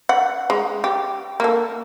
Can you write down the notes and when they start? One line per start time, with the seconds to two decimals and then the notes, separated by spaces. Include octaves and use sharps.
0.09 F#5
0.50 G#3
0.84 G4
1.40 A#3 A4